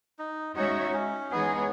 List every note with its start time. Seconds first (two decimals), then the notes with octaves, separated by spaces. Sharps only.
0.19 D#4
0.56 G#3 C#4 D#4 F#4 C#5 E5
0.93 C#4
1.31 E3 G#3 B3 D#4 G#4 C#5
1.57 B3